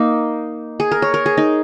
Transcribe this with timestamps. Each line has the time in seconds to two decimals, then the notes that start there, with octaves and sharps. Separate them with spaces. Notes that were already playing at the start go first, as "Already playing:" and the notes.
Already playing: A#3 D#4
0.80 G#4
0.92 A#4
1.02 C#5
1.14 A#4
1.26 G#4
1.38 D#4